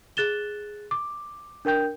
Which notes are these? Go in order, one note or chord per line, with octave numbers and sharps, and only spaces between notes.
G#4 F#6 A6 E7 G7
D6
D4 A#4 G5 G6